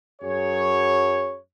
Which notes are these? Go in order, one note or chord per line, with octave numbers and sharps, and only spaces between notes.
F#2 F#3 G#4 C#5